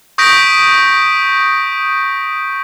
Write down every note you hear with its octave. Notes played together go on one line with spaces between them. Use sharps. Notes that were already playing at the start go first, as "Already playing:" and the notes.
C#6 D#6 G6 A#6 B6 D7